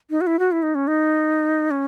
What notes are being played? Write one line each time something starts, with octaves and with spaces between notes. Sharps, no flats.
D#4
F#4
E4
F#4
E4
D#4
C#4
D#4
C#4